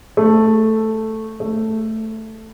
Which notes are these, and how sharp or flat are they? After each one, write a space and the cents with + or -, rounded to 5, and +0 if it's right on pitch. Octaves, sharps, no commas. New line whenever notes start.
A3 +0
A3 +5